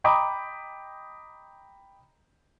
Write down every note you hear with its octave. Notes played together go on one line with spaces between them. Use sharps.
D#5 G5 A#5 B5 D6 D#6